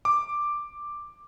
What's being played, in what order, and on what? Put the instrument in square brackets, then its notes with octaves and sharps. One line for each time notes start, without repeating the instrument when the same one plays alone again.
[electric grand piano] D6